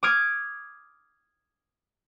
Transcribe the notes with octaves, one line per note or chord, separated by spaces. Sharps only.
D6 D#6 F6 G#6 D7